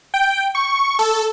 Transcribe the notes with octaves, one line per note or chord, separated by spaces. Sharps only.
G5
C#6
A4